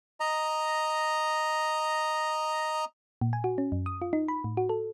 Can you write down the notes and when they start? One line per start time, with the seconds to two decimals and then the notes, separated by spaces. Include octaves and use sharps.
0.20 D#5 A#5
3.21 A#2
3.33 G#5
3.44 F#4
3.58 C#4
3.72 F#2
3.86 D#6
4.02 F4
4.13 D#4
4.28 B5
4.44 A2
4.57 F#4
4.69 A4